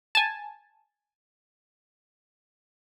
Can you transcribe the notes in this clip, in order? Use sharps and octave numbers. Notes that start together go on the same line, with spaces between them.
G#5 A5